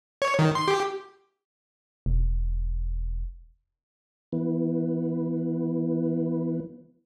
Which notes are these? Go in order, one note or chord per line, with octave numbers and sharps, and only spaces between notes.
C#5
D#3
C6
G4
E1
E3 B3